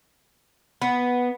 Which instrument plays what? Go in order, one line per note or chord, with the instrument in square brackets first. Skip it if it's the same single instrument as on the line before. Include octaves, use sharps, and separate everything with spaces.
[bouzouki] B3